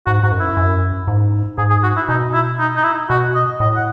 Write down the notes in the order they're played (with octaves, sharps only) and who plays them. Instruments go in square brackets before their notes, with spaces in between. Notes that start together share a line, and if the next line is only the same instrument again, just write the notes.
[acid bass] G#2 [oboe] F#4
[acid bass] G#2 [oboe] F#4
[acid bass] F#2
[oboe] E4
[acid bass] F#2
G#2
[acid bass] G#2 [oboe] G#4
[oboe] G#4
F#4
E4
[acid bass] B2 [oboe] D#4
[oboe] E4
D#4
D#4
E4
[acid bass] B2 [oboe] F#4
[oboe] D#5
[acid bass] A2 [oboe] D#5
[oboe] F#5